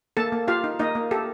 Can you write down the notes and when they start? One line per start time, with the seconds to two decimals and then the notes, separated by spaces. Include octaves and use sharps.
0.17 A#3 A4 A5
0.32 A#3
0.47 F4 G4 F5
0.64 D#4
0.79 A#3 D#4 D#5
0.95 A#3
1.11 G4 A4